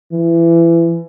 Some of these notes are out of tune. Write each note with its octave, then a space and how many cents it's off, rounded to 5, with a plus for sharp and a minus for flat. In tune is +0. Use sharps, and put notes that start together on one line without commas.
E3 +25